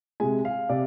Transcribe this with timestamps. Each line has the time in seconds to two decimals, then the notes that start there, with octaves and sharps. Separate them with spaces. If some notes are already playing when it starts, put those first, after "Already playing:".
0.20 C3 G#3 G#5
0.45 F5
0.69 C3 D5